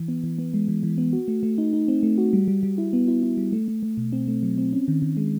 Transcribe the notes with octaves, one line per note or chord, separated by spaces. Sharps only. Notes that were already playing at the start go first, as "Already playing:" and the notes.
Already playing: E3
B3
E3
B3
G#3
E3
E3
B3
F#4
A3
A3
D#4
D#4
C4
A3
F#4
G3
G3
G3
E4
B3
E4
E4
G3
A3
A3
A3
B2
C4
A3
F#3
C4
C#4
D#3
D#3
G#3